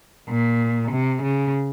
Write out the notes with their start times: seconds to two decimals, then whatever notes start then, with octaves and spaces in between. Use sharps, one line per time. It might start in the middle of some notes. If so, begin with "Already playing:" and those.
0.29 A#2
0.91 C3
1.22 C#3